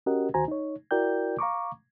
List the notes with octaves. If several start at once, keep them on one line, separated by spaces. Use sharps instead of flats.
C#4 F#4 G4 A#4 D#5 F#5
D2 D#3 F#4 C5 G#5 A#5
D#4 C#5
E4 F#4 A#4 D5 G5 G6
F5 A#5 C#6 D6